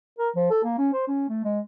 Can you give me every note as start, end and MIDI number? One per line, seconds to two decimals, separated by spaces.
0.19 0.29 70
0.35 0.46 53
0.50 0.60 69
0.64 0.74 58
0.78 0.88 61
0.93 1.06 72
1.07 1.28 61
1.29 1.39 57
1.44 1.60 56